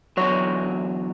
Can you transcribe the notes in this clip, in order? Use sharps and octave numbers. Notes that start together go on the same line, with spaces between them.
E2 D3 F#3 C#5